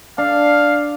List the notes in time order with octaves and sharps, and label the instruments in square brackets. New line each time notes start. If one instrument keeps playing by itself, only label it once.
[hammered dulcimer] D4 [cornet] F5